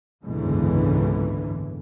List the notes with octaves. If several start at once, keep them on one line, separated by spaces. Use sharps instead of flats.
F#1 C#2 G#2 B2 D3 E3